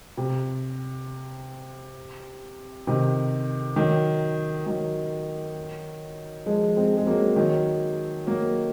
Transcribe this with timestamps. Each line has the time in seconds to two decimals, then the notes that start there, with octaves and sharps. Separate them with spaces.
0.17 C3
2.87 C3 D#3
3.76 D#3 F#3
4.66 D#3 F#3
6.46 F3 G#3
6.77 G#3 C4
6.97 G#3
7.06 F#3 A#3
7.36 D#3 F#3
8.27 F#3 A#3